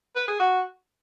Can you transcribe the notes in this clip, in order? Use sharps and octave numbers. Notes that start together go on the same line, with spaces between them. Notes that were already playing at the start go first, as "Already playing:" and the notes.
B4
G#4
F#4